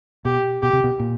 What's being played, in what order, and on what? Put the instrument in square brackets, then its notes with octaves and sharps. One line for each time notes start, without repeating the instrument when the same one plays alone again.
[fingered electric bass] B2 [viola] G4
[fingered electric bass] B2 [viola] G4
[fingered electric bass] C3
B2
A#2